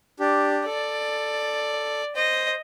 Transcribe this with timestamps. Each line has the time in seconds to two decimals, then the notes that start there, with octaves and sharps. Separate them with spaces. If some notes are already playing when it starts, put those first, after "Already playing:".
0.20 D4 G4
0.66 A4 D5
2.16 C5 D#5